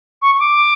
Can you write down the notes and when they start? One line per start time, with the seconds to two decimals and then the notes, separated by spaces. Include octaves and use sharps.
0.22 C#6
0.35 C#6
0.40 D6